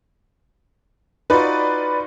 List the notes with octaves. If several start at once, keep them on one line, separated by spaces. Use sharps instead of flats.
D#4 F4 F#4 B4 D5